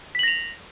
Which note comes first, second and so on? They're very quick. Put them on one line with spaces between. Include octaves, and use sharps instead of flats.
B6 F#7 A#6 F7